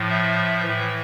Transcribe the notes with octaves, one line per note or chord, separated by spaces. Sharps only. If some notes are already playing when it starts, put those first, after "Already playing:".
Already playing: A2 F3
E5
A2 E3